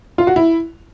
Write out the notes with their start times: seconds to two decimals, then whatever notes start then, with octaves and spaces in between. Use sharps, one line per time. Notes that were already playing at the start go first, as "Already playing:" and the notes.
0.18 F4
0.27 F#4
0.36 E4